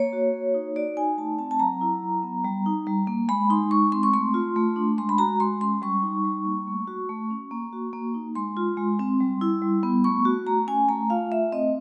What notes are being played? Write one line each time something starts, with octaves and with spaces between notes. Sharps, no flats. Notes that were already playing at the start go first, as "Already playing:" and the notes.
Already playing: A#3 C#5
F#4
A#3
D#4
F#4 D5
D#4 G#5
A3 A5
C4 A5
A5
F#3 A#5
E4
F#3
B3
G3
D#4
G3
A#3
G#3 B5
D#4 C6
G#3 C#6
C4 C6
C#6
A3 C6
F4
A3
D4
G#3 C6
B5
F#4 A#5
G#3 C6
C#4 C6
G3 C#6
D#4
G3
A#3
A3
F#4
A3
C#4
A#3
F#4
A#3
D#4
G#3 C6
F4
G#3
C4
G3
E4
G3
B3
A3 C#6
F#4
A3 A#5
C#4 G#5
A3 A#5
F4 F5
A3 E5
C4 D#5